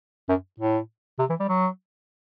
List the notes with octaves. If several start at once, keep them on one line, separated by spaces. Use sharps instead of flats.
F#2
A2
C3
E3
G3
F#3